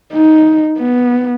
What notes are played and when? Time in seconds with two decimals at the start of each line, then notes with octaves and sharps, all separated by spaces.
0.13 D#4
0.78 B3